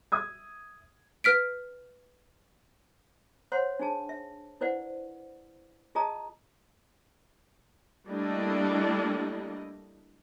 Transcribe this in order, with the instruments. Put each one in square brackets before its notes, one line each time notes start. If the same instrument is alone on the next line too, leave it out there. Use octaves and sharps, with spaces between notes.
[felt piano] E5 D#6 G#6
[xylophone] B4 F6 B6 D7
[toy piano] C5 C#5 F#5 C6
D4 D#4 G#4 A5
E5
E4 B4 C5 D5 F#5
F4 G#4 D#5 A5 A#5 D#6
[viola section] G3 A3 A#3 D4 E4 D#5